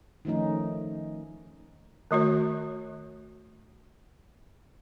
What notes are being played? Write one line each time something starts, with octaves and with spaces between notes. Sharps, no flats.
D#3 F3 A3 C#4 D#4
D#3 A3 F#4 C#5